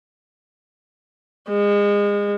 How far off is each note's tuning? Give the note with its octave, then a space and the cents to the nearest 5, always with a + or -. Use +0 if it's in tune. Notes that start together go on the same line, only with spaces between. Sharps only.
G#3 -30